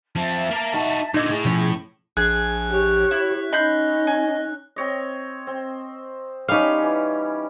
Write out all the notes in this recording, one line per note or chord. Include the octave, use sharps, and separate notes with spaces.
F3 C4 E5 A5
A#3 A#4
D#4 F#4
A#2 D3 D#4 D#5 D6 E6 G#6
A2 G#4
B2 F3 C#4
A#1 G#4 F#6
G4 C#5
E4
C#4 D#4 D#5 B5 C6 G6
G#5
C4 C#5 D#5
C4
G3 C#4 D#4 F5
E3